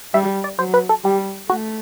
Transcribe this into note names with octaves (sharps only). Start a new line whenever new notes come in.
G3 E5
D5
F#3 C5
B4
A4
G3 G4
A3 F#4